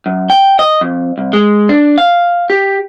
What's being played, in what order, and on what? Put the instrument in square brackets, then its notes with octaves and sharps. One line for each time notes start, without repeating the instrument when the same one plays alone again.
[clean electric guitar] F#2
G5
D#5
F2
C2
G#3
D4
F5
G4